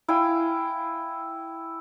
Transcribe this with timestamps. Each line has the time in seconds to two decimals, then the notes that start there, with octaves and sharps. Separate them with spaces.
0.08 E4 F5 G5 G#5